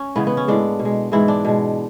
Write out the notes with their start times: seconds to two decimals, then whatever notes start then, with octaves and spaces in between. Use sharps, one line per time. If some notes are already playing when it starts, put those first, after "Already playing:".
Already playing: C#4
0.16 C#3 E3 G#3 B3
0.27 B3
0.37 C#4
0.48 A2 G#3 D4
0.79 B2
0.85 G#3
1.12 G#2 E3 G#3 E4
1.28 D4
1.45 B2 G#3